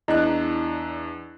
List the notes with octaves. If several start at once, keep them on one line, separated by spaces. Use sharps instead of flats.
E2 D4 E4 D#5 F#6